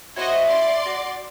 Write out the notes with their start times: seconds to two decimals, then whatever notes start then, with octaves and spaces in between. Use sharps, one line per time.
0.16 E4 F#4 C5 C#5 D#5
0.47 D5 C6
0.86 F#4